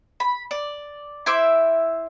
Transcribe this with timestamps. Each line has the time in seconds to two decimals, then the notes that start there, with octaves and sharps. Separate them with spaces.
0.20 B5
0.51 D5
1.26 E4 C5 E5 D6